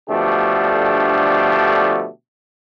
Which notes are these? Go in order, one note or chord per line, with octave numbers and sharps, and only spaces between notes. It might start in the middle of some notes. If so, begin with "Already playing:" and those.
B2 D3 F3 A3 D4 G4